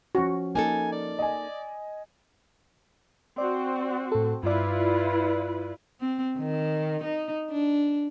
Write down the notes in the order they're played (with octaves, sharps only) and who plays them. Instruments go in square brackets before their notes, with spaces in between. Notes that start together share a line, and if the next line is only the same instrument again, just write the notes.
[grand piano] F3 C#4 [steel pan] F#4
[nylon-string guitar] A#3 D#4 A4 [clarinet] G#5
[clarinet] D5
[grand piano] D#5 G#5
[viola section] C4 F#4 [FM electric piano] D5
[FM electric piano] A2 A4
[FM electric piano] G2 D5 [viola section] E4 F4 B4
[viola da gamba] C4
D#3
D#4
D4